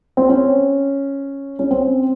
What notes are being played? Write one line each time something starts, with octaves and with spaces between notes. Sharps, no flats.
C4
C#4
C#4
C4